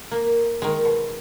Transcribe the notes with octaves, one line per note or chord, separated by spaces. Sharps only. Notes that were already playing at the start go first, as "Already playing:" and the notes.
A#3
D#3 G#3
B2